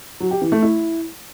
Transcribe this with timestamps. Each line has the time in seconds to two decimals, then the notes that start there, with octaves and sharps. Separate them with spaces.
0.20 F#3
0.31 G4
0.41 E3
0.52 A3
0.62 E4